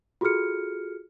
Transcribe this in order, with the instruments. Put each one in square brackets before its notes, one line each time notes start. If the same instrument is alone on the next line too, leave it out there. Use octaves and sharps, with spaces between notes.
[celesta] F4 F#4 G#4 A4 F6 C#7